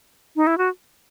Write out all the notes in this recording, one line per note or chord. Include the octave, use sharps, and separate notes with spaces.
D#4
E4
F#4